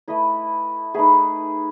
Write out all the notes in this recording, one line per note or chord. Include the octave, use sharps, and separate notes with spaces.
A3 E4 B4 D#5
A3 D#4 G#4 B4